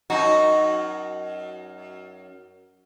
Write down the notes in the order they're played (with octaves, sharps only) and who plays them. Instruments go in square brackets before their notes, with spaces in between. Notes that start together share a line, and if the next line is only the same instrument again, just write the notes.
[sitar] F#2 D#4 [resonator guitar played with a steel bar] F#4